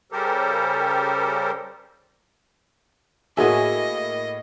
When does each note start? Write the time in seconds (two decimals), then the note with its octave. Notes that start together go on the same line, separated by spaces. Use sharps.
0.12 C#3 G3 G4 A4 A#4 C5
3.37 A2 A#3 F#4 G#4 D#5 E5 G#5